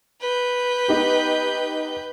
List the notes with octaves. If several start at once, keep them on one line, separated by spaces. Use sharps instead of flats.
B4 G6
B3 D#4 G4